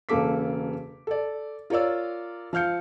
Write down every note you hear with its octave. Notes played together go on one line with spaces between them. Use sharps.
E1 C#3 A#3 A4 D6 B6
A4 D5
F4 A#4 C#5 D5 E6
F3 F5 F6 G6 C#7